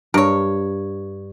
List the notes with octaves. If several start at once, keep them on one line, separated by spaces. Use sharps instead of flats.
G2 A#4 C#5